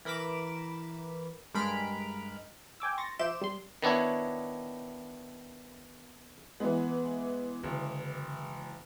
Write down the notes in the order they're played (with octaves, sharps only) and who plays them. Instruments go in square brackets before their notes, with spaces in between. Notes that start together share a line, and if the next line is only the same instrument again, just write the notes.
[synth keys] E3 A#4 B5 D6 E7
G2 G#3 A#4 B5 F6 D7
[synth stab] G5 G#5 D6 E6
C6 C#6 A6 A#6
F3 E5 C6 D6 G6 E7
G3 C6
[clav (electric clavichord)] D#3 B3 D4 E4 C#5
[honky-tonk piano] E3 G#3 [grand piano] B3
[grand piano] F#1 [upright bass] D3